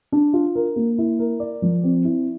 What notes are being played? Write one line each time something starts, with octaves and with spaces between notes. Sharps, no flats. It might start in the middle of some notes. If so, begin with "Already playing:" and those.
D4
F4
A#4
A#3
E4
A#4
D5
F3
C4
E4